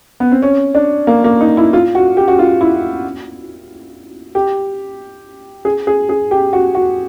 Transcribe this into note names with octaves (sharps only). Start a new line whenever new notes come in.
B3
C4
C#4
D4
A#3
A#3
D#4
E4
F4
F#4
G4
F#4
F4
E4
G4
G#4
G#4
G#4
G4
F#4
F#4